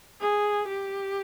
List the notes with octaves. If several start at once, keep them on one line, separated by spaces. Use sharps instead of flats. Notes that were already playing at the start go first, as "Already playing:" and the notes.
G#4
G4